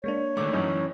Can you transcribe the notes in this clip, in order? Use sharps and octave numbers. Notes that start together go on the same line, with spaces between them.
G#3 A#3 D4 C#5
D3 D#3 A3 D6
F#2 E3 C#4 D#4